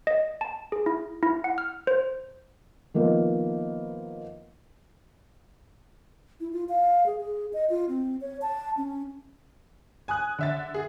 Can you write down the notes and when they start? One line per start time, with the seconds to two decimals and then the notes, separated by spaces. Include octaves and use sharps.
0.07 D#5
0.41 A5
0.72 G#4
0.86 E4
1.23 E4
1.44 F#5
1.58 F6
1.87 C5
2.94 D#3 F3 A#3 B3
6.40 E4
6.53 F4
6.69 F5
7.06 G#4
7.20 G#4
7.53 D#5
7.70 F4
7.89 C4
8.21 C#5
8.42 A5
8.77 C#4
10.08 G#5 D#6 F#6
10.39 D3 E5 A6
10.74 G#4